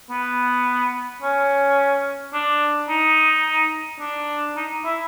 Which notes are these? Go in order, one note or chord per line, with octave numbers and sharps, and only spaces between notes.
B3
C#4
D4
D#4
D4
D#4
E4